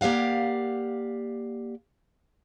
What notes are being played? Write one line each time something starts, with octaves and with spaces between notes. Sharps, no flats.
A#3 G4 D5 F5 F#5